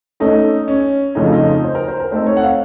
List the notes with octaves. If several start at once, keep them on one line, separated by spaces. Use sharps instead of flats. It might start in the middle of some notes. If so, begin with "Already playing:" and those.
A3 C#4 D#4 A4
C#4
F2 C#3 A3 D#4
F4
D#4
C5
A#4
C5
A#4
A3 C4 D#4 A4 C5
C#5
F#5
F5